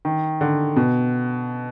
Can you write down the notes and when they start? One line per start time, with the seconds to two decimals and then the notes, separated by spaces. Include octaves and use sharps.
0.05 D#3
0.41 D3
0.76 B2